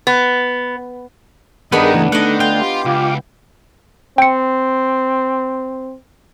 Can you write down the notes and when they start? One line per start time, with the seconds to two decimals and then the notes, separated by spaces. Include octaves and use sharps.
0.07 B3
1.72 G2 D#3 B3 D4 D#4 G#4 A#4 B5
1.94 C#2 E3 A3
2.12 D3 D#3 A3 D4 D#5 F#5
2.40 F4 G5
2.61 G4 C6 D6
2.86 C#2 F4 G4 F5 D6
4.18 C4 G5 C#7